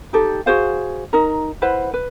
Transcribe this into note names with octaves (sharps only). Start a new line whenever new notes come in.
D#4 G4 A4
F#4 G#4 C5 F5
D#4 A#4
E4 B4 C5 F#5
B4